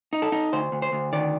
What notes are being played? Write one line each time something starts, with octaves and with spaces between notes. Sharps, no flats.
D#4
A4
D#4
D2 C5
D2
C5
D2
D#3 D5